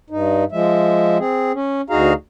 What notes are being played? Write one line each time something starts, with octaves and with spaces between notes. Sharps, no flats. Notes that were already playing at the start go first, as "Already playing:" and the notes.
G2 D#4
F3 G#3 E5
C4 G#4
C#4
D2 D#4 F#4 G#4 F5 A#5